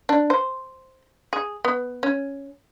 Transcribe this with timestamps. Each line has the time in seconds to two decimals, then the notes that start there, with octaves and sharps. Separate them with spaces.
0.09 D4
0.30 C5
1.33 G#4
1.65 B3
2.03 C#4